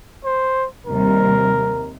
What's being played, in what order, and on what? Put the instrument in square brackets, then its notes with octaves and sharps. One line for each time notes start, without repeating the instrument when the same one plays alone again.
[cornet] C5
[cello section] D#2 C3 G3 [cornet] A#4